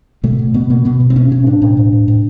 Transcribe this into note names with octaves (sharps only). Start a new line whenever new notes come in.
B2 A3
B2
B2 B3
B2 A#3
B2 B3
B2
C4
B2 C#4
B2 C#4
A2 D4
A2
A2
A2
A2